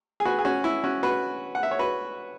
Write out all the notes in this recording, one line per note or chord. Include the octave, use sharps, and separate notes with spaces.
G#4
F#4 B4
G#4
C#4 F#4
E4
C#4 F#4
F#4 B4
F#5
E5
C#5
F#4 B4